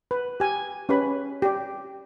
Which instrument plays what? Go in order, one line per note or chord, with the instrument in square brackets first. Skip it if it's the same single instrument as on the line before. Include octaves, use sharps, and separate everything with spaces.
[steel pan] B4
G4 G#5
C#4 G4 B4 B5
G4 D5